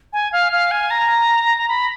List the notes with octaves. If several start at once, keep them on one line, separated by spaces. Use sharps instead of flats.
G#5
F5
F5
G#5
A#5
A#5
B5